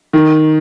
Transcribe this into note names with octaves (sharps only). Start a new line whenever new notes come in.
D#3